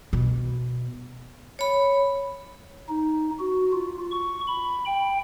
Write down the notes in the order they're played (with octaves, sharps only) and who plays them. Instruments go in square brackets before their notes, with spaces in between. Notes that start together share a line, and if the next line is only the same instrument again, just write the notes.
[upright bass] B2
[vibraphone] C#5 B5
[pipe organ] D#4
F#4
F4
C#6
B5
G5